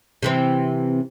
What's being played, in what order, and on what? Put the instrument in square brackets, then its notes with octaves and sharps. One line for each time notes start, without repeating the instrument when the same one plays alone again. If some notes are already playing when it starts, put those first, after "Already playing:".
[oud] C3 E3 C4